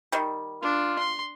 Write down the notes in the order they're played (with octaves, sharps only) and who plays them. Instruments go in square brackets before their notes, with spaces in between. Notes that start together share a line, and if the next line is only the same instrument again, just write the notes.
[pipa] D#3 G3
[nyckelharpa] D4 [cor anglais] F4
[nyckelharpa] C6